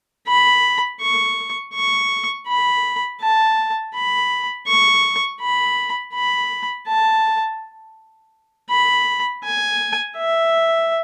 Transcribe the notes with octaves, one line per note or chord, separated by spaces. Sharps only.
B5
C#6
C#6
B5
A5
B5
C#6
B5
B5
A5
B5
G#5
E5